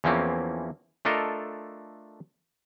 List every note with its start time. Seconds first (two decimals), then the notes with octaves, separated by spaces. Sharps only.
0.04 E2 E3 F3 A#3 C4 C#4
1.05 A3 D4 F4 A4 A#4 D#5